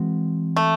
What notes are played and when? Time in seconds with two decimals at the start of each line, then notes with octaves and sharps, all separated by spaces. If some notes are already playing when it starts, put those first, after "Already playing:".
Already playing: E3 G#3 C4 F#4
0.56 A3